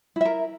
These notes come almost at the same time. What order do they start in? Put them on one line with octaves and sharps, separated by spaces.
E4 E5 A#4